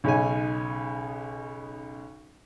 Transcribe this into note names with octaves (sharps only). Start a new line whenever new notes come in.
B1 C#3 C#4 D#4 G#5